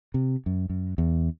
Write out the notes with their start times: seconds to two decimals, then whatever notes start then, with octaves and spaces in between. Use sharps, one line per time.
0.14 C3
0.46 F#2
0.70 F#2
0.98 E2